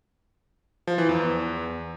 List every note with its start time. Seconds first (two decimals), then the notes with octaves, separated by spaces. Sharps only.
0.87 F3
0.98 E3
1.09 E2